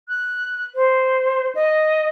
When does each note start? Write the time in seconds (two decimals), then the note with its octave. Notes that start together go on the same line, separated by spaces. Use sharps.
0.08 F#6
0.75 C5
1.55 D#5